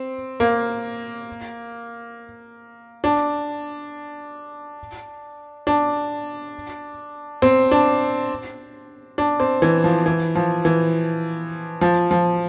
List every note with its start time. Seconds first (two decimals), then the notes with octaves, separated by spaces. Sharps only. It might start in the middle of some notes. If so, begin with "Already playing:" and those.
Already playing: C4
0.40 A#3
3.04 D4
5.67 D4
7.42 C4
7.71 D4
9.18 D4
9.40 C4
9.62 E3
9.84 F3
10.06 E3
10.35 F3
10.65 E3
11.81 F3
12.11 F3